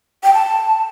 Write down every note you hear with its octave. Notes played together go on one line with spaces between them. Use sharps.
G5
A5